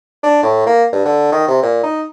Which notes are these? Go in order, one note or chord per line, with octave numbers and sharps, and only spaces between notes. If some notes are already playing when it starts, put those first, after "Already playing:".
D4
A2
A#3
G2
D3
D#3
C3
A#2
D#4